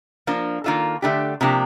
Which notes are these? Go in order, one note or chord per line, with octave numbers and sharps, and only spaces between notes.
F3 A#3 D4
D#3 A#3 D4 F4 A4
D3 A3 D4 G4
C3 F3 A#3 D4 G4